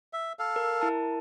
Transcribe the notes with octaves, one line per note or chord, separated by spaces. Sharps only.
E5
A4 F5
A#4
E4 A#4 A5